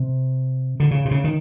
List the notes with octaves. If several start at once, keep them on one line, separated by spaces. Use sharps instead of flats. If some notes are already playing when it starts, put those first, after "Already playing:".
Already playing: C3
D3
C#3
C3
C#3
D#3